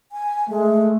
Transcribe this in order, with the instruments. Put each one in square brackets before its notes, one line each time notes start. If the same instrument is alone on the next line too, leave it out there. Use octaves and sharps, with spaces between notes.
[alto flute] G#5
[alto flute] G#3 [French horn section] A3